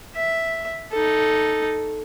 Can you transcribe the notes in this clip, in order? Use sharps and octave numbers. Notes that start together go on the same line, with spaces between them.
E5
D#4 A4